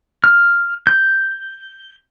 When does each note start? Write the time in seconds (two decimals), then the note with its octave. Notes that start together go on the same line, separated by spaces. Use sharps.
0.24 F6
0.87 G6